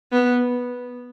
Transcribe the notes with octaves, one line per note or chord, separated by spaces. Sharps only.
B3